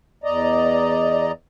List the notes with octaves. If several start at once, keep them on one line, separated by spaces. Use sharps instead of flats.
E2 D5 D#5 A#5